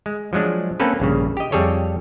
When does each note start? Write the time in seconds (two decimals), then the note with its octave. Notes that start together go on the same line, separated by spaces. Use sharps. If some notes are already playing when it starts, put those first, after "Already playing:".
0.06 G#3
0.33 F3 F#3 G#3 D4
0.80 A#3 C4 C#4 A4 B4
1.00 A#1 G2 C#3
1.37 G4 D#5
1.52 F2 G3 G#4 A4 C#5